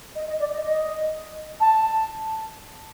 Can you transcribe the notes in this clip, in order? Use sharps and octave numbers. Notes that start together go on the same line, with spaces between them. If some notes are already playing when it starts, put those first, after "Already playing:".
D#5
D#5
D5
D#5
D#5
A5